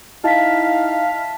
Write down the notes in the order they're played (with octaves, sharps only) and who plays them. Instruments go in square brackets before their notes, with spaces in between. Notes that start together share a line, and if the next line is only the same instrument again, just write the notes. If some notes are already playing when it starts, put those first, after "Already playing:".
[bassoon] D#4 [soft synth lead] E4 [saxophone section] F5 [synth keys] A5 B6